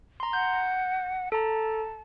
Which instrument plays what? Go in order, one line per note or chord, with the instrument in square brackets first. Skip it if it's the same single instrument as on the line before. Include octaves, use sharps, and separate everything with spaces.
[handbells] A#5 C6
[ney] F#5 [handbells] G6
[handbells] A4 A#5 [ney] A5